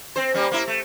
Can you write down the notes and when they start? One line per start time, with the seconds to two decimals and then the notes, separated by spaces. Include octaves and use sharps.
0.16 C4 C5
0.34 G3 A#3 C#4
0.51 A#3 E4
0.67 A3